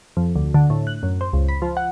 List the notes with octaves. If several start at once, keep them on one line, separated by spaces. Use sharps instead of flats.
F2
D2
D3
A2
F#6
F#2
C5
C#2
B5
F3
F#5